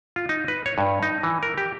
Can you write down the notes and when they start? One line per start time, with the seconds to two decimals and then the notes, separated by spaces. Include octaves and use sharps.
0.16 F4
0.29 D#4
0.48 B4
0.66 C#5
0.78 G2
1.03 D#4
1.23 E3
1.43 A#4
1.58 G4